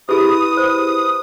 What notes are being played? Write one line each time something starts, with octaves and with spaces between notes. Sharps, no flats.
E4 G4 G#4 B4 D#6
C5